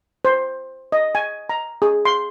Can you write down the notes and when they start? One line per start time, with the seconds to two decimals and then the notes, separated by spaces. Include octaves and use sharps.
0.25 C5
0.92 D#5
1.15 G#5
1.49 A#5
1.82 G#4
2.05 C6